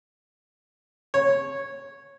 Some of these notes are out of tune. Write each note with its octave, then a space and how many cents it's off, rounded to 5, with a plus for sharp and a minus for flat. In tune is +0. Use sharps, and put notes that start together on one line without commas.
C#5 -15